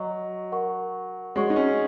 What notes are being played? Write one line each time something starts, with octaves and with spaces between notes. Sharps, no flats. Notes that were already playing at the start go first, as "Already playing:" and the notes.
Already playing: F#3 F#4 D#5 A#5 C#6
A#4 F#5 C#6
G#3 F#4 C#5 F#5 C#6
D#4
C#4